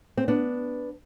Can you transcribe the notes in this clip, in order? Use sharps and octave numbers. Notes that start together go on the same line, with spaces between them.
C4
B3 D4